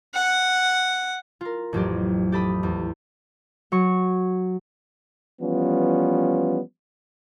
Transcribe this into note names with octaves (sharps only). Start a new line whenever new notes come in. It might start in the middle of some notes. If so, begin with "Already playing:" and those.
F#5
F4 A#4
A1 F2 F#3 G4
G4 A4 B5 D#6
E2
F#3 C#6
E3 F3 G3 B3 C#4 F4